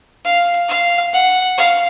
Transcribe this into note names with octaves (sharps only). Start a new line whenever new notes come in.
F5
F5
F#5
F5